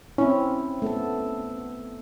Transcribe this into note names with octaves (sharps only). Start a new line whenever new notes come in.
C4 C#4 E4
A3 B3 A4